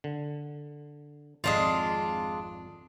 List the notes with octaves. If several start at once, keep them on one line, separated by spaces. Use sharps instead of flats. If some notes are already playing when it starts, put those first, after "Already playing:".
D3
G#1 F2 G#3 D4 F4